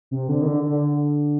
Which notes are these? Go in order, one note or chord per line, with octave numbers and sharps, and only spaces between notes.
C3
D3
D#3
D3
D3